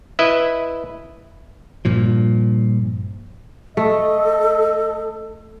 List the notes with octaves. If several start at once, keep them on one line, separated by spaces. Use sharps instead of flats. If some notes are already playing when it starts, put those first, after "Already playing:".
E4 B4 D#5 E5
G2 A#2 F3
A3 A4 D#5